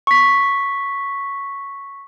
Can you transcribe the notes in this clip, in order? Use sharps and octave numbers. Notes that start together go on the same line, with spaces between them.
C#6 B6